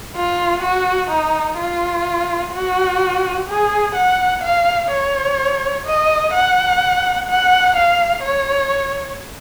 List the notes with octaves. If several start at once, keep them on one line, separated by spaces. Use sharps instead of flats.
F4
F#4
D#4
F4
F#4
G#4
F#5
F5
C#5
D#5
F#5
F#5
F5
C#5